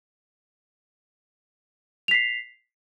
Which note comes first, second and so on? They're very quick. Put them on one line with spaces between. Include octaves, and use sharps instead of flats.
F7 B6 C7